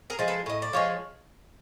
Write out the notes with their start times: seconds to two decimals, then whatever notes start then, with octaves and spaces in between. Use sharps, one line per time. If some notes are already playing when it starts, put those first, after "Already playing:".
0.10 G#4 A#4
0.19 F3 G#3
0.28 A4 B4
0.46 A2 D#5
0.62 D5
0.73 F3 G#3 C#5